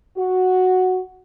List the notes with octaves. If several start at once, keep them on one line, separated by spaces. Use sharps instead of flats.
F#4